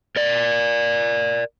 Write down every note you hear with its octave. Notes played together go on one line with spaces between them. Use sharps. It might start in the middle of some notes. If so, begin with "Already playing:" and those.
A#4 D5